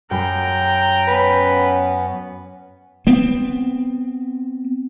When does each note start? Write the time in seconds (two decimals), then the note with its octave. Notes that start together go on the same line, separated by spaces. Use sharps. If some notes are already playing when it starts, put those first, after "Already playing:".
0.11 F#2 G5 A#5 B5
1.07 B3 C#4 B4
3.07 B3 C4